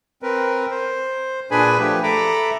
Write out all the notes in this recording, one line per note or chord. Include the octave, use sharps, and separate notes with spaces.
C4 A#4 B4
C5
A#2 D4 G#4 B4 G#5 B5
F3 A3 G4 B4
A4 E5 A#5 B5 D6